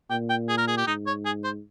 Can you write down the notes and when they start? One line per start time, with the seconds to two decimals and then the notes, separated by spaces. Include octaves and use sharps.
0.10 A#2 G5
0.29 G5
0.49 G#4
0.58 A#4
0.67 G#4
0.77 G4
0.87 G#2 D#4
1.07 C#5
1.25 G#4
1.44 C5